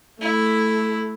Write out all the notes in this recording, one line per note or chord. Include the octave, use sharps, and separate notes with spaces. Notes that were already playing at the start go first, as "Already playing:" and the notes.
A3 E4